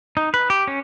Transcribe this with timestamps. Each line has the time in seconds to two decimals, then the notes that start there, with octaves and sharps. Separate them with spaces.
0.17 D#4
0.34 B4
0.50 G4
0.67 C#4